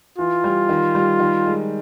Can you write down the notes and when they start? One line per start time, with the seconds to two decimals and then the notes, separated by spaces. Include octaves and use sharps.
0.18 E3 F4
0.44 G3
0.69 D#3
0.95 G3
1.19 D#3
1.46 G#3